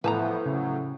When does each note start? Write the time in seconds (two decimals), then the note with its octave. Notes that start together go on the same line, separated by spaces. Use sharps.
0.04 A2 E3 F3 B3 B4 A5 A#5
0.46 C#3 F#3